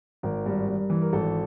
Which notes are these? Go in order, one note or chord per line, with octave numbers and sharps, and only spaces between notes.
G#1 A#4
G2
G2
E3
A#4
G#1 A4